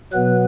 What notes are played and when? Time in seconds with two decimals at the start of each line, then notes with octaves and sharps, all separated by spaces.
0.13 B2 F#3 B3 B4